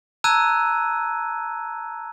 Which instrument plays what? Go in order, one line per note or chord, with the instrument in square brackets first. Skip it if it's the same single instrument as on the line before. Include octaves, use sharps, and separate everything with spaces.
[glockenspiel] A5 A#5 E6 F#6 G#6 D#7